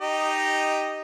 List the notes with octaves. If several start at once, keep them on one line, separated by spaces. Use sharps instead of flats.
D#4 G4 D#5